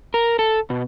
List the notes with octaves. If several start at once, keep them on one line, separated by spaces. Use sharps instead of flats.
A#4
A4
B2